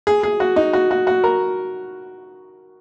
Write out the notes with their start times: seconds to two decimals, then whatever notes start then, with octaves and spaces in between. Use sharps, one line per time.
0.07 G#4
0.23 G#4
0.40 F#4
0.56 D#4
0.73 F#4
0.91 F#4
1.07 F#4
1.24 A#4